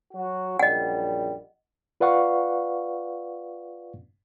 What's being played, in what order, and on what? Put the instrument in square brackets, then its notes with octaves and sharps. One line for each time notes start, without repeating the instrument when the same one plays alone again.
[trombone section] F#3 F#4
[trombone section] A#1 F#2 G3 [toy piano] D#5 F#5
[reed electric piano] F4 B4 D5 F5 F#5 C#6